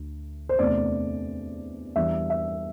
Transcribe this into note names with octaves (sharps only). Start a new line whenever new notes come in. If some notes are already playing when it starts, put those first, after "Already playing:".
Already playing: D2
C5
E2 C3 A3 D4 D5
E2 E3 G3 D4 E5
E5